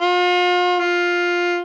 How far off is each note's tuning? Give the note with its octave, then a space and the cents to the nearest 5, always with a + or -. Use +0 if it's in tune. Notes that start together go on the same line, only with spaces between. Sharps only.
F4 +40
F4 +10